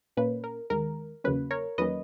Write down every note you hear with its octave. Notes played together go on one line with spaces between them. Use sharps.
A#2 A#3 C#4 B4
A#4
D#2 D#3 G#3 A#4
E2 C#3 F#3 A#3 C#4 B4
A#4 C#5
E2 D#3 F#3 A#3 C#4 B4 D#5